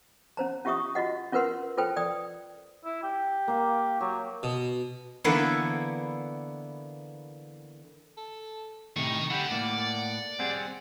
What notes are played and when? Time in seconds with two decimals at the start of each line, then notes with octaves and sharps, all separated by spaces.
0.37 C#4 C5 A#5
0.65 C#4 F4 G4 E5 C#6 D#6
0.95 F4 F#4 D#5 F#5
1.32 C#4 F4 A#4 B4 F#5 C6
1.78 F4 A4 B4 C5 G5
1.97 D5 G5 D#6
2.85 E4
3.03 G4
3.48 A#3 F5
4.01 F#3 G4
4.43 B2
5.24 D3 E3 A#3 B3 E4
8.17 A4
8.96 A2 C3 D#3 D#4 C#6
9.31 D3 E4 G4 F#5
9.51 A2 A#3 D5
10.39 G3 C4 G#4 F#5